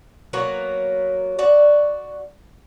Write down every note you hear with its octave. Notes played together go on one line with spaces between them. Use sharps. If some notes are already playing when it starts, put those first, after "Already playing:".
F#3 A#3 B3 F#4
F#4 D5